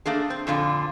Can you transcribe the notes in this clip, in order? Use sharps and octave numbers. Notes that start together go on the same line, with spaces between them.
A3 A#3 D4 G#4
C4
F2 A#2 D3 F4